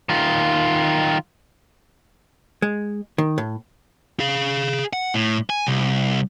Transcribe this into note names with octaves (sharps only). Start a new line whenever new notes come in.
D#3 F4
G#3
D#3
A2
G#4 F5
F#5
A2
G#5
C2